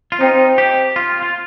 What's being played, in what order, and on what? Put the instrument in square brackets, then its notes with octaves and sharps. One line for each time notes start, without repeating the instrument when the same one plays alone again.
[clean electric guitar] F4
[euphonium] C4 [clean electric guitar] D#4
[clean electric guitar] G4
F4
F4